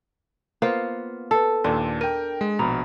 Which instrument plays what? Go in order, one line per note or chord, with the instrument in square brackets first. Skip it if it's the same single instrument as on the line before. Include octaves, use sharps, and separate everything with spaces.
[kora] A#3 B3 F4 [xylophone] C5
[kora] A4 [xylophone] B4 E6
[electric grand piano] D#2 A#2 [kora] D4 [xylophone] A4 C6
[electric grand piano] A#4 G5 [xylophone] D#7
[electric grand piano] G#3
[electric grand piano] A#1 B2 [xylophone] A#5 B5